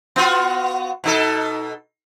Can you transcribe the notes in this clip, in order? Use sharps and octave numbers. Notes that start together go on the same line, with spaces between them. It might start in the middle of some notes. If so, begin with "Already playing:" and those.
B3 F4 F#4
B2 D#4 A4